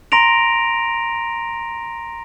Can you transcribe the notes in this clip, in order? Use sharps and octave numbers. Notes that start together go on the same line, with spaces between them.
A#5 C6 A#6 D7 F7